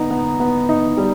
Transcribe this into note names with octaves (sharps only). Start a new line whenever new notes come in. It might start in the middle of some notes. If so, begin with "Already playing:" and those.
Already playing: B3 D#4 A#5
B3
B3
D#4
G3